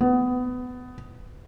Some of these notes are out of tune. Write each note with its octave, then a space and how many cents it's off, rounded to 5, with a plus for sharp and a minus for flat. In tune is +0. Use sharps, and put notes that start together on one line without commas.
B3 +20